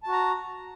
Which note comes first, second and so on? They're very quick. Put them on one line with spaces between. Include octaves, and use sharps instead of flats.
A5 F#4 A#5